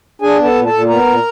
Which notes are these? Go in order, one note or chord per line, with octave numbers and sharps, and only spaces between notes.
D4 G#4 G#5
B3
A4 A5
A#2
A4 A5
A#2
B3 A#4 A#5
A#2